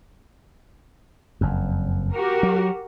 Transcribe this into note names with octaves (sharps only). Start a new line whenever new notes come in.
F#1 F2
F#4 G4 A#4
F#3